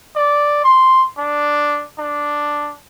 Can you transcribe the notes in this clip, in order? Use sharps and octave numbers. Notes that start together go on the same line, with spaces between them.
D5
C6
D4
D4